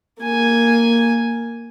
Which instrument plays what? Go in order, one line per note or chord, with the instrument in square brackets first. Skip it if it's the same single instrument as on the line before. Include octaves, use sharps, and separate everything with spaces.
[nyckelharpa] A#3 G#5